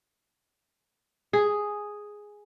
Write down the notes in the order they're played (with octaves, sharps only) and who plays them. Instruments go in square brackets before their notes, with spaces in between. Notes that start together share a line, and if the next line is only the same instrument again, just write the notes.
[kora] G#4